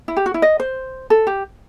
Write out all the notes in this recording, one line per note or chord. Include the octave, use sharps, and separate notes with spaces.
E4
G4
F#4
E4
D#5
C5
A4
G4